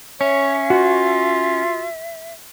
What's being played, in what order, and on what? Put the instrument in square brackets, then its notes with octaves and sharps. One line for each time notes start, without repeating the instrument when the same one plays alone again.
[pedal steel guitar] C#4 [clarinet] C#5 [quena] E5
[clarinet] F4 [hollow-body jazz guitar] F#4